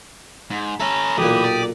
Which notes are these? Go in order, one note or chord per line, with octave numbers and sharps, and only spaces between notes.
G#2
C#4 A4 B4 E5 G#5 A#5
B1 A#2 E3 G4 D#6
D5